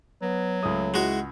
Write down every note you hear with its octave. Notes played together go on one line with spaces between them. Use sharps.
F#3 B3
C#2 A3 D#6
G#3 E4 F#4